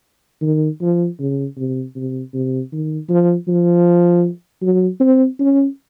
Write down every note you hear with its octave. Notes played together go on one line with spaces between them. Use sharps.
D#3
F3
C#3
C3
C3
C3
D#3
F3
F3
F#3
C4
C#4